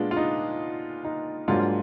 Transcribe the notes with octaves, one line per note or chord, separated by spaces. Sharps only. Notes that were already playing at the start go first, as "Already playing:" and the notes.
Already playing: A#2 G#3 B3 D4 F4
F4
D#4
D#4
G#2 F#3 A#3 D4 F4
F4